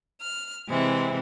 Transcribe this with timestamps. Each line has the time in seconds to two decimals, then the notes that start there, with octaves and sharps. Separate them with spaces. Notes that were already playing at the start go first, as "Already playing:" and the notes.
0.21 F6
0.68 C3 E3 G#3 C4